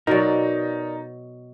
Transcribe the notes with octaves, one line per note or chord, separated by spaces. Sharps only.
B2 F#3 D#4 A#4 D5